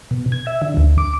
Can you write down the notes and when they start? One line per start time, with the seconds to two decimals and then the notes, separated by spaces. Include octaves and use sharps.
0.11 B2
0.32 G#6
0.47 E5
0.62 D3
0.77 D2
0.98 D6